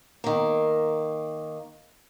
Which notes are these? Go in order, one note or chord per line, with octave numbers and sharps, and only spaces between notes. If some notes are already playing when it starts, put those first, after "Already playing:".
D#3 A#3